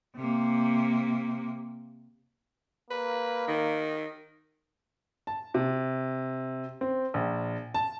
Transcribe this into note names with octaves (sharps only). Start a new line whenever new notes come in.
C3 A#3
A#3 B4
D#3
A5
C3
C4
A#1
A5